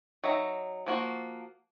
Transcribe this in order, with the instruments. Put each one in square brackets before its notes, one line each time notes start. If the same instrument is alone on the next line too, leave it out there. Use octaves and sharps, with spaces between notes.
[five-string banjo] F#3 D#4 E5 A#5
F3 A#3 F#4